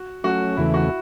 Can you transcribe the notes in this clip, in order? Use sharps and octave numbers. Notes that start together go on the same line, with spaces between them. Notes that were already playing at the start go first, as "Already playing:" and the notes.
Already playing: F#4
F#3 A3 C#4 F#4
E2 C#3 E3 A3 E4
F#4